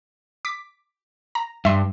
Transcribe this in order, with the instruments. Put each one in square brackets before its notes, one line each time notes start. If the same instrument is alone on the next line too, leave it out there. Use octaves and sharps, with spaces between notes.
[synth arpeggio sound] D6 B6
A#5
[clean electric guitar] G2 [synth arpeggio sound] E5 C6